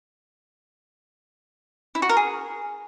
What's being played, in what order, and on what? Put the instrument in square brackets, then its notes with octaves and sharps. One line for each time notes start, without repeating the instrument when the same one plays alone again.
[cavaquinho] E4
F#4
A#4
G#4